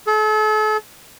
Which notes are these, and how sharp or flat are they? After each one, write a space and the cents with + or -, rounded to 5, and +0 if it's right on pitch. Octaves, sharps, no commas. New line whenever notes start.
A4 -40